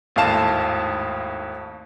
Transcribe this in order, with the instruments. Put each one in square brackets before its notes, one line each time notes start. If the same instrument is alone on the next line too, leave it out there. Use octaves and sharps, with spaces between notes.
[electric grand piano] G#1 D#2 A2 F5 A5 E7